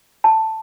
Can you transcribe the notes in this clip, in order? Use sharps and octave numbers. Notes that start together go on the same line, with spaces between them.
A5